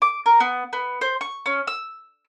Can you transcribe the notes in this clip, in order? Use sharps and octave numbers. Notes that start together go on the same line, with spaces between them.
D6
A#4
B3
B3
C5
C#6
C#4
E6